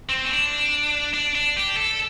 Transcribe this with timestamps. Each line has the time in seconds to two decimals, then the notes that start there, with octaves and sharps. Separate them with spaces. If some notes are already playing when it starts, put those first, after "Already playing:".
0.09 C4
0.25 C#4
0.31 D4
1.14 D4
1.35 D4
1.57 G4
1.77 A4